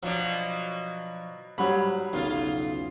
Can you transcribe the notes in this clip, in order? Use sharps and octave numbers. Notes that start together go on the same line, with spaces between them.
B2 F3 F#3 D4
G#2 F#3 G3 B5
B1 E2 C#3 F4